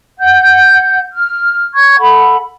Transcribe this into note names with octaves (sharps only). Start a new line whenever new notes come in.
F#5 G6
F6
C#6 G#6
A4 F#5 B5